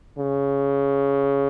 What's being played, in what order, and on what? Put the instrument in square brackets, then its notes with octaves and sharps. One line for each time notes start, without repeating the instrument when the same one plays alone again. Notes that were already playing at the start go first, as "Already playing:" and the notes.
[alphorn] C#3